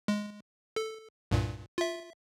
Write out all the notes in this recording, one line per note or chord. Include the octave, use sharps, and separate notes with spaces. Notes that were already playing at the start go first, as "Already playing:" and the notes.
G#3
A4
C2 G2 A#2
F4 E5